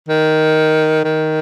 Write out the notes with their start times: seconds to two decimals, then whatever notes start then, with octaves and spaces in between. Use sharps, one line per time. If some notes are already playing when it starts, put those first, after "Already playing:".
0.09 D#3
1.04 D#3